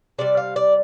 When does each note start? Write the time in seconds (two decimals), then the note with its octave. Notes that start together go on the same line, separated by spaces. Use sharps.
0.18 C3 G3 D5
0.37 F5
0.56 D5